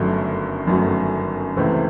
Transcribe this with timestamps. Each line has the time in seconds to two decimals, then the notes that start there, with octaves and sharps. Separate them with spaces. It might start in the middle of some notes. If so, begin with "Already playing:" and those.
Already playing: G1 F#2 D#3 F#3 A3
0.67 G1 F#2 D#3 F#3 A3
1.56 C#2 C3 E3 A3 C4